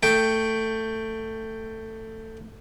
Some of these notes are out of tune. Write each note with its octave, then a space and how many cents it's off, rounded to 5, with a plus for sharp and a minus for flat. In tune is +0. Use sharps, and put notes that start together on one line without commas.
A3 +15 G5 +0